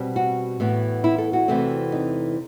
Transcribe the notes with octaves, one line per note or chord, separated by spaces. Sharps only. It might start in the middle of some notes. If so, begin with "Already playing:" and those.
Already playing: B2 G3 C4
F#4
A2 E3 B3
E4
A4
F#4
E2 C3 E3 A3 C4
D#4